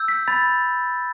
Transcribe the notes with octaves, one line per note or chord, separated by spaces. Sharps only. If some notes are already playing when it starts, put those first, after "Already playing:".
Already playing: E6 G6
B6
B5 A6